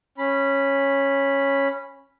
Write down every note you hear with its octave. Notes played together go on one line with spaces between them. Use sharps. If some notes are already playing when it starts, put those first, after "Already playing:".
C#4 B5